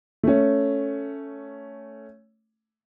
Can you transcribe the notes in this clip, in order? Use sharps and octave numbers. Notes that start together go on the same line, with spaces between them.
A3 C#4